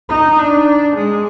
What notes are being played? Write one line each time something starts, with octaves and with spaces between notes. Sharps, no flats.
D#4
D4
G#3